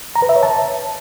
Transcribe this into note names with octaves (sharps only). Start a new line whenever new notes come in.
A#5
B4
E5
C#5
A5